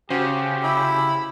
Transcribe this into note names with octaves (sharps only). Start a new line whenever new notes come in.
C#3 C#4 F#4 G4 C5
E4